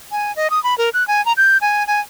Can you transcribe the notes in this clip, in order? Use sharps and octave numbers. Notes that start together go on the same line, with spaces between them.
G#5
D#5
D#6
B5
A#4
F#6
G#5
A#5
G6
G#5
G#5